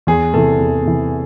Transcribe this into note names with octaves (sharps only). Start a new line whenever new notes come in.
E2 G#4
C3 E3 A4
E2
C3 E3